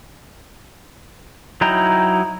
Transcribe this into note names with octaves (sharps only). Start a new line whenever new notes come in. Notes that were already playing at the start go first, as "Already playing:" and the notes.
F#3 D#4 E4 G5 A#5